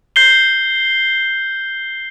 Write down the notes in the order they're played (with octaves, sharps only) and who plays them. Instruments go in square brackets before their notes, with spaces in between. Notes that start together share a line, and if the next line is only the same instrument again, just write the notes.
[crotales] G6 C7 G7